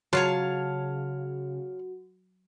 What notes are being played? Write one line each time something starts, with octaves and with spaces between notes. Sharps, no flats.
C#3 F#3 F4 F#4 C#5 F5 A5